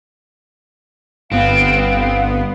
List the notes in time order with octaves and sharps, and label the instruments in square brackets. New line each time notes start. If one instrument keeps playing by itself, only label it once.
[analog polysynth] G1 B3 [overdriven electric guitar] C4 [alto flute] F5